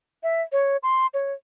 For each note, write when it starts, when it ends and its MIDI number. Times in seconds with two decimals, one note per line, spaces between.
0.23 0.42 76
0.52 0.77 73
0.83 1.07 84
1.14 1.33 73